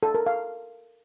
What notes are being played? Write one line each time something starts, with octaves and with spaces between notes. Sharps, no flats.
A4
A#4
F5